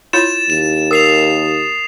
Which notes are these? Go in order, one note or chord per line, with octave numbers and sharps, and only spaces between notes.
E4 F4 C#5 A6 E7
D#2 E7
A#4 D#6 C7 F7